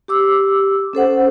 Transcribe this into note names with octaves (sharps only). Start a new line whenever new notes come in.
G4 D6 E6
C#4 A4 C5 F#5